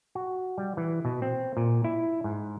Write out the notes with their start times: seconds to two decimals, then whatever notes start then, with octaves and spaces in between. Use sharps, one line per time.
0.15 F#4
0.58 G3
0.77 E3
1.05 B2
1.22 C4
1.57 A#2
1.84 E4
2.24 G#2